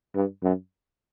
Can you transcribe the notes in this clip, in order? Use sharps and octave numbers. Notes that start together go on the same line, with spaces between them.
G2
F#2